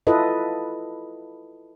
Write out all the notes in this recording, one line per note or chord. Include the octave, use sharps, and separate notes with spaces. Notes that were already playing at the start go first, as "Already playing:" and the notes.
E4 F4 A4 B4 D#5